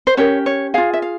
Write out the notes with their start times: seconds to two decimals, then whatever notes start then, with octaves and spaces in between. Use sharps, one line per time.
0.07 C5
0.17 C#4 G4 A#4 C#5
0.46 C#5
0.74 F4 G#4 F5
0.94 E5
1.02 F5